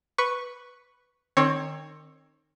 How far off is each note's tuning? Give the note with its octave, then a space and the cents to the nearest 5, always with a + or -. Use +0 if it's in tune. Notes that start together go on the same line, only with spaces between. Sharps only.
B4 +0 C#6 +0
D#3 -25 C4 +25 C#5 +0